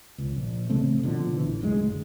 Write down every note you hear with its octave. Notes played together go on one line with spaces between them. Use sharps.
C#2
A#1
A1 C#3 A3 C4
B2 D3 F3
A1 E3
F#1 D2 B2 G#3